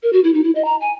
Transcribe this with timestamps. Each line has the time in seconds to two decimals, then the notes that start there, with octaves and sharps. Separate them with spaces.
0.03 A#4
0.13 F#4
0.24 E4
0.34 D#4
0.44 E4
0.55 D#5
0.65 A#5
0.81 G#5